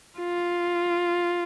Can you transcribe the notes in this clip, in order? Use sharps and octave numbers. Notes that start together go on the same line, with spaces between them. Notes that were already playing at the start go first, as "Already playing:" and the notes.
F4